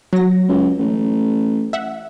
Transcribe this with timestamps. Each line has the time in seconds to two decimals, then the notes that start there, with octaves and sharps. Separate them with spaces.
0.13 F#3 A#6
0.48 C#2
0.79 A1
1.73 E5 F#5